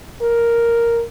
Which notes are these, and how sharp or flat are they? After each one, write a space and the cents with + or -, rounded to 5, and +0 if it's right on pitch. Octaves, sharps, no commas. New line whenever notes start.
A#4 +0